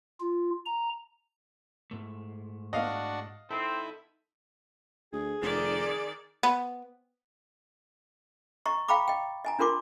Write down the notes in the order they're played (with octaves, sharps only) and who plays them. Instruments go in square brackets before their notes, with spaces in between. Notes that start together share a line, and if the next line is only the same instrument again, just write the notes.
[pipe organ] F4
A#5
[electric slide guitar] G#2 A3
[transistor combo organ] D4 F#4 [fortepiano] D#5 F5
[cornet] C4 [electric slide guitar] D#4 A4 [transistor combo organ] E4
[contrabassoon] D2 [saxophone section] G#4
[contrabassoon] F1 [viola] D#3 D5
[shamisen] B3
[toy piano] D#5 A#5 C#6
F5 G5 A#5 B5 D6
D#5 G5
D#5 G#5 A#5
D4 F4 A#4 C6 D6